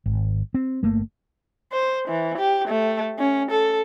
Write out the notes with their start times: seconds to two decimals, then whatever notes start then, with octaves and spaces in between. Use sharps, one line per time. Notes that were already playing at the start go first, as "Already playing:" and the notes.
0.06 G#1
0.54 C4
0.83 G1 A3 A#3
1.72 C5
2.08 E3
2.38 G4
2.68 A3
3.19 C#4
3.51 A4